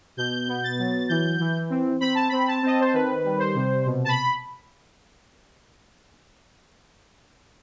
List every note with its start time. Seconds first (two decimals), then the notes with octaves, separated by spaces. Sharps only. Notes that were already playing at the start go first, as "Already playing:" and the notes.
0.17 B2 G6
0.48 B3
0.63 A6
0.78 F#3
1.09 E3 G6
1.40 E3
1.70 C4
2.00 C4 B5
2.15 A5
2.29 C4 B5
2.47 A5
2.63 C4 D#5
2.80 C5
2.93 D#3 B4
3.24 G3
3.39 C5
3.55 C3
3.86 B2
4.05 A5
4.09 B5